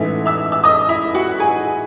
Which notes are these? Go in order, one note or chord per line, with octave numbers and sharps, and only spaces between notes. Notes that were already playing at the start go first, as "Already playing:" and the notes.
Already playing: A1 G#2 E3 A3 E5
E5 E6
E6
D#5 D#6
E4 E5
F#4 F#5
G#4 G#5